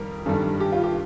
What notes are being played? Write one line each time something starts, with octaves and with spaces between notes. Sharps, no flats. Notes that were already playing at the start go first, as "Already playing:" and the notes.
Already playing: F2 D#3 G3 A#4
G2 D#3 G3 A4
G4
F4
G4